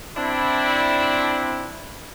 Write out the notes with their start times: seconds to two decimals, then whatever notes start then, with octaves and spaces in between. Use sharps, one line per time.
0.17 C4 D4 E4